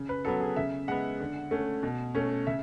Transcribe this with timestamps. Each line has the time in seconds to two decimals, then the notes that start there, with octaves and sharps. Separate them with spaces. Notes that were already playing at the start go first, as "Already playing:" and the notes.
Already playing: C#3
0.09 B4
0.25 F#3 B3 A4
0.40 G#4
0.56 C#3 E5
0.88 G#3 B3 F#5
1.20 D3
1.51 A3 C#4
1.83 B2
2.15 A3 C#4
2.47 C#3 E5